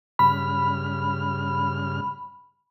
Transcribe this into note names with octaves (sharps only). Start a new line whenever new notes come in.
G2 C#3 B5 F6